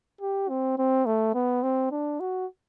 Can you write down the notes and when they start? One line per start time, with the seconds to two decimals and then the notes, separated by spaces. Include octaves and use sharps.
0.21 G4
0.49 C4
0.78 C4
1.06 A3
1.35 B3
1.63 C4
1.92 D4
2.20 F#4